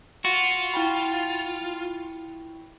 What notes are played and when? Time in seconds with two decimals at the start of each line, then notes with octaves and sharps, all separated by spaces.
0.25 F4 F#4
0.74 E4 G5 B5